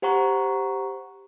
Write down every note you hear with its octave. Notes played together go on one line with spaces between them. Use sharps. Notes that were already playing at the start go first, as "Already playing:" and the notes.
G4 C5 F#5 A#5 C#6